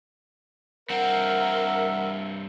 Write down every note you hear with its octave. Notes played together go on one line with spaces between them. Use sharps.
G2 C4 A#4 E5 F#5